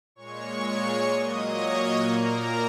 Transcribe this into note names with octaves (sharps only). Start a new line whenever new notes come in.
A#2 G#3 C#5 C#6
A#2 F#3 A#3 D#5 D#6
C#5 C#6
A#2 A#3 A#4 A#5